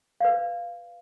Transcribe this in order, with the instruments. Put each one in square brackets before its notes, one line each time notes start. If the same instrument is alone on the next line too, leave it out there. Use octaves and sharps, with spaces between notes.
[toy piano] B4 D5 F5